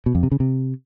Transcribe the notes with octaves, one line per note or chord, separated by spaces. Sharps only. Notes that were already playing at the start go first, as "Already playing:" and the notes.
B2
F2
C3
C#3
C3